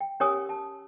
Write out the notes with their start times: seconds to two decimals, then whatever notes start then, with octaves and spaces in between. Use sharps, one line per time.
0.01 G5
0.20 C#4 G4 A#4 C#5 G#5 D#6
0.49 A5